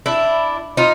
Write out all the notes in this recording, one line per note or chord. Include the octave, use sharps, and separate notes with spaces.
D4 E4
D#4 F4